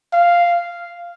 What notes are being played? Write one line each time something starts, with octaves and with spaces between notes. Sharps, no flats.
F5